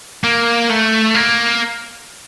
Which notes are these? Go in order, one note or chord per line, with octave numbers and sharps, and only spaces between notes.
A#3
A3
A#3